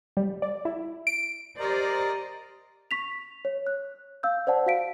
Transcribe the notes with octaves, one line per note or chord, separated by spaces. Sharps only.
G3
D5
E4
D7
G4 A#4 C5 D5 D#5 A#5
C#6 B6 F7
C#5
F#6
F5 E6 G6
C5 D5 F#5 A5
F#4 F5 B6 D7